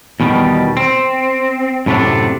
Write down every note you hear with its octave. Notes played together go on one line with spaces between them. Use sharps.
E2 B2 D#3 G3
C4
F#2 A2 C3 A3 D4